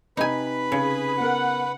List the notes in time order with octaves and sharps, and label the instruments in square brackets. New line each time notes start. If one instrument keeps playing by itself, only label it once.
[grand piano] C3 [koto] D#4 G#5 [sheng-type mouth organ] B4 B5
[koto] C#3 [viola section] G#4
[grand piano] B3 A#4 [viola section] F#5